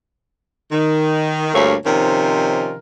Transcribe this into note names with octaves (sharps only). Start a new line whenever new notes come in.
D#3
D2 G2 A3 A#3 A#4 C#5
C3 D#3 F3 C#4 D#4 A#4